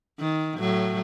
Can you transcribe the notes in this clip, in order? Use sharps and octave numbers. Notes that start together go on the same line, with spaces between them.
D#3
A2 F#3